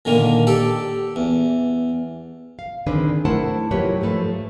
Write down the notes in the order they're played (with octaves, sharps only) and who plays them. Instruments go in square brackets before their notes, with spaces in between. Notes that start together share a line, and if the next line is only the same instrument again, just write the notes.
[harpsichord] A#2 D3 D#3 A#3
G4 A4 D5
E2
[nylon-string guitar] F5
D3 D#3 C4 D4 G#4 B4
A3 E4 A#4 C5 F#5 A5
F#3 A#3 F4 G4 B4 C#5
G#2 F3 A3 B4